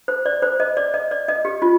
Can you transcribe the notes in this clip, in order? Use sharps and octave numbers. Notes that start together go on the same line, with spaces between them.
C5
D5
C5
D#5
D5
D#5
D5
D#5
G4
F4